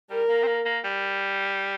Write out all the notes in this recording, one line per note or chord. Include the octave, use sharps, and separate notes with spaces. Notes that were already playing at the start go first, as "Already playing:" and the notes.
G3 A#4
A#3
C4
A#3
A#3
G3